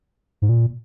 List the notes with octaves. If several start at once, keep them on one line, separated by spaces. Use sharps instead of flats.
G#2
A#2